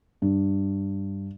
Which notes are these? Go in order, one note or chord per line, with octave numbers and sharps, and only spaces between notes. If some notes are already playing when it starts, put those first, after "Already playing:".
G2